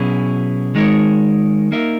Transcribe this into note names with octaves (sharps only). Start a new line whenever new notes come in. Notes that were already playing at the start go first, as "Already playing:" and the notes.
Already playing: B2 F#3 C#4 E4 G#4
D#3 G#3 D#4 A#4 C#5
A#3 D#4 A#4 E5